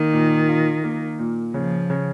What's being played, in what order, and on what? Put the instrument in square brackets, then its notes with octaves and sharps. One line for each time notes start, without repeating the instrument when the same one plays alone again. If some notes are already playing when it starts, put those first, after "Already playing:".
Already playing: [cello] D#3 [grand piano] A#3
[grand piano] A#2
F4
A#3
A#2
[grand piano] C#3 [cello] F3
[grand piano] C#3